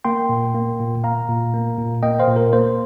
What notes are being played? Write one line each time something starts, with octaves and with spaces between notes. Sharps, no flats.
A#3 G5 C6
A#2
A#3
A#2
A#3 F5 A#5
A#2
A#3
A#2
A#3 D#5 G5
C5 F5
A#2
A#4
A#3 C5